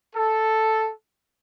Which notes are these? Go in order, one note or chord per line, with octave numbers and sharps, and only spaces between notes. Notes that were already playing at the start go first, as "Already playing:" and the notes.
A4